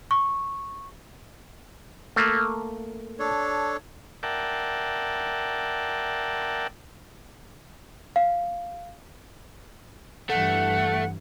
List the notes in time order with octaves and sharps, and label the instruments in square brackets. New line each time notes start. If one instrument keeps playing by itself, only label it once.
[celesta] C#6
[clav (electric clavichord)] A3 A#3
[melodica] D4 A4 C#5
[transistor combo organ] A#4 D5 E5 F#5 G5 A5
[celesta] F5
[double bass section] G2 E3 [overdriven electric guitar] A3 [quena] F#5